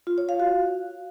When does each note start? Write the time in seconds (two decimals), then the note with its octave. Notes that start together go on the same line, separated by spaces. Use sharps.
0.07 F4
0.18 C#5
0.29 F5
0.40 F#4